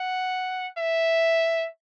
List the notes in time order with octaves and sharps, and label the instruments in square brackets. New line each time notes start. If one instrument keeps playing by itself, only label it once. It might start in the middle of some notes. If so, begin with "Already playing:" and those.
Already playing: [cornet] F#5
E5